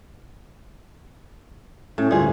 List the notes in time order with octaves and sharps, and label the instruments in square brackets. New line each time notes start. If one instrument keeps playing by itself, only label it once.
[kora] A2 [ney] C#4
[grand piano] D2 G2 [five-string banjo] G3 G#4 [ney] F4